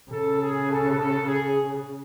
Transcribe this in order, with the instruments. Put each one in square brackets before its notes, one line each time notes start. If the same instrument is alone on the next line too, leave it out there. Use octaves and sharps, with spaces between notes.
[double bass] C#3 [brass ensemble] A4
[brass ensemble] G#4
A4
A4
G#4